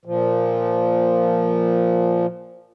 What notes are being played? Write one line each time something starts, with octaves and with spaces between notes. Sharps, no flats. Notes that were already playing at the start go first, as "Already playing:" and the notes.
A#2 F3